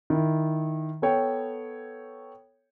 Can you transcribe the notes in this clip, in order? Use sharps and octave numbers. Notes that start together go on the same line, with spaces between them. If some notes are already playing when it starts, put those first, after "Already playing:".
D#3 E4
B3 A4 C#5 G5